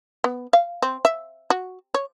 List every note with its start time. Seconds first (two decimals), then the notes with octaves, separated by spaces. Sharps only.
0.24 B3
0.53 F5
0.82 C4
1.05 E5
1.50 F#4
1.94 C#5